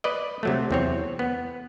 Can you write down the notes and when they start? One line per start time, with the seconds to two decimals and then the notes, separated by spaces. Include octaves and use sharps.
0.04 B4 D5 D#5
0.43 C3 F#3 A3
0.71 E2 C4 C#5
1.19 B3